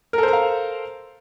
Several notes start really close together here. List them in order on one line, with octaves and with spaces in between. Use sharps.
A#4 A4 C5 A#5 F5